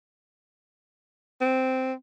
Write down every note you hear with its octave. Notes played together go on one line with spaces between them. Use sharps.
C4